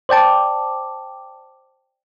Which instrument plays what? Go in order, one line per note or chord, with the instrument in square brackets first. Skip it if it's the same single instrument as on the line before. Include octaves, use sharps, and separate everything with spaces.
[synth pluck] C5 D5 G5 A5 D6